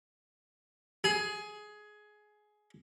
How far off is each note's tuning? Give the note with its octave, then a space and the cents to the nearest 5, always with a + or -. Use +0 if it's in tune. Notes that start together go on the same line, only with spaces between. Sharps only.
G#4 +15